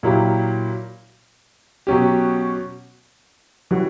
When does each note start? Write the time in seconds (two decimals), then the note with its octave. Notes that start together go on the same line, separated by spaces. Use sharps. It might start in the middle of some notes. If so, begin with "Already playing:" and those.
0.03 A#2 F#3 A#3 E4 G4
1.87 B2 F#3 C#4 G4
3.71 E3 G3 C#4 F#4